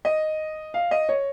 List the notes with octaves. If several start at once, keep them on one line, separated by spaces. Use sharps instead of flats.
D#5
F5
D#5
C#5